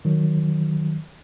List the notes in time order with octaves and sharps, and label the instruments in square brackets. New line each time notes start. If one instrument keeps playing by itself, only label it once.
[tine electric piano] D#3 F#3